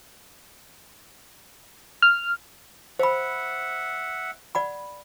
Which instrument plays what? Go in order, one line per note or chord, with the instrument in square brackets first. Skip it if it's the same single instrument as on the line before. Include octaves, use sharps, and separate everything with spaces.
[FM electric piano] F6
[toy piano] C5 B5 [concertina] E5 F#5
[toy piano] D5 F#5 B5